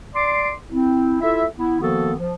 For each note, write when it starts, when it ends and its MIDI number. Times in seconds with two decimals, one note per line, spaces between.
0.14 0.52 74
0.14 0.52 84
0.14 0.52 86
0.71 1.16 60
0.71 1.16 64
1.20 1.44 64
1.20 1.44 65
1.20 1.44 69
1.20 1.44 76
1.57 1.76 59
1.57 1.76 64
1.80 2.13 51
1.80 2.13 53
1.80 2.13 58
1.80 2.13 59
1.80 2.13 66
1.80 2.13 69
2.19 2.35 53